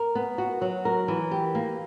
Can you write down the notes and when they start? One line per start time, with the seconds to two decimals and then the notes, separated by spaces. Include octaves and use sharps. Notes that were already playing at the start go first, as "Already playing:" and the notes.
Already playing: A#4
0.15 B3
0.38 F#4
0.61 F#3
0.85 A#4
1.08 E3
1.31 G4
1.55 A#3